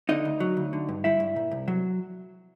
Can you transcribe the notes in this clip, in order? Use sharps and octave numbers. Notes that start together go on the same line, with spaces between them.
D3 D#4 D#5
D2
F#3
D2
D3
G2
G3 E4 E5
G2
A#2
C2
F#3